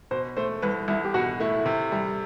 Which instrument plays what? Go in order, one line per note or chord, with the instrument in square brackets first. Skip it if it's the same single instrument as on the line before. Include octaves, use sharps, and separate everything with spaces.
[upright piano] B2 [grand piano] C5
[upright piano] A3 [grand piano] C5
[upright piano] C2 [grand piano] B4
[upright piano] C2 [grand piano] E4
[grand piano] G4
[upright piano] B2 [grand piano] F#4
[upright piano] A3 [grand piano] E4
[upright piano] C3
G3